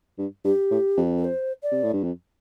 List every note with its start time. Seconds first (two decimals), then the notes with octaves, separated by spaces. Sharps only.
0.18 G2
0.44 G2 G4
0.71 A2
0.97 F2
1.18 A4
1.24 C5
1.63 D5
1.72 C3
1.83 A2
1.93 G2
2.03 F2